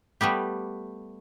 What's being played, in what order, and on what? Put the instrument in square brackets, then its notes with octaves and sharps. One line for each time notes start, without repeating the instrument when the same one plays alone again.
[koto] G3 A3 B3 G4